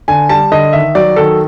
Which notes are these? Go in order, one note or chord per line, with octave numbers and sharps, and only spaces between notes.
D3 G#5
G3 A5
D3 D#5
D#3 E5
F#3 D5
D#3 A4